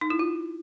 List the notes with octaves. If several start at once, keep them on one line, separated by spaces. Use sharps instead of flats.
D#4
E4
F4